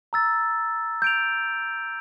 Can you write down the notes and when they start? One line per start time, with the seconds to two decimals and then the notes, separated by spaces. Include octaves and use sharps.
0.13 A#5 E6 A6
1.02 G6 D7 F7